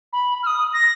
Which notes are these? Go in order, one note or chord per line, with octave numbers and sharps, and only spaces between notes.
B5
F6
D#6
A#6